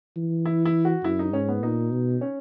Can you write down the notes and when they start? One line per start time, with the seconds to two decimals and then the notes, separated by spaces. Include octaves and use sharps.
0.16 E3
0.46 E4
0.66 E4
0.85 F#4
1.04 F#2 E4
1.19 D#4
1.33 G#2 C#4
1.49 B3
1.63 A#2 D#4
1.92 B2
2.21 C#4